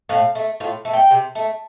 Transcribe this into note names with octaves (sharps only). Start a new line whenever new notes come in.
A2 F5
A3
A2 F4
A3
G5
C3
A3